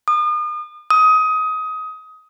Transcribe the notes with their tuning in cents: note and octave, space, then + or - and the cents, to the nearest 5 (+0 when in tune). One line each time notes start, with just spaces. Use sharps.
D#6 -40
D#6 +20